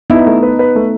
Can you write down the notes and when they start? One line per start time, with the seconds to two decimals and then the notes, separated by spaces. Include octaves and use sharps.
0.10 B3 D#4 E4
0.26 A3
0.43 B4
0.59 B4
0.76 A3